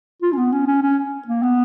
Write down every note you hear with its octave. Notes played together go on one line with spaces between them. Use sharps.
F4
C#4
B3
C#4
C#4
C#4
A#3
B3